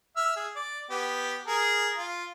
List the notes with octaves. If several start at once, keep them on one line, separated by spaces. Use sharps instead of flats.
E5 E6 F6
G#4
D5
B3 G4
G#4 A#4
F4